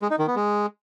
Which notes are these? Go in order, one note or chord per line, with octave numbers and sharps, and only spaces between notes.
G#3
D#4
D#3
B3
G#3